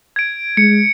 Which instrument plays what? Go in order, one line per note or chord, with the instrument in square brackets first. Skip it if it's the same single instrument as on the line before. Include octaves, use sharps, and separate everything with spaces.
[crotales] G#6 D7
[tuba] G#3 [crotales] C#7